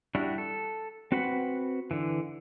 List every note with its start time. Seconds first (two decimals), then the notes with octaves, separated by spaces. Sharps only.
0.15 G3 D4 E4 F#4
0.38 A4
1.12 C4 F#4 B4 F#5 B5
1.91 D3 E3